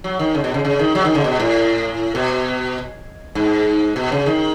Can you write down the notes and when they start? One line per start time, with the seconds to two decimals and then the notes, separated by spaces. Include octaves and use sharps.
0.04 F#3
0.19 D#3
0.35 C#3
0.44 B2
0.54 C#3
0.65 C#3
0.79 D#3
0.95 F#3
1.05 D#3
1.15 C#3
1.24 B2
1.40 A2
2.15 B2
3.35 G#2
3.96 B2
4.12 C#3
4.26 D#3